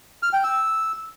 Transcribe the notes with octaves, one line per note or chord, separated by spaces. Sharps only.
F6
G5
E6